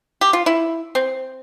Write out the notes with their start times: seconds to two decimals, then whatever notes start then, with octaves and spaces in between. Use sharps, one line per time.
0.21 G4
0.33 F4
0.46 E4
0.95 C4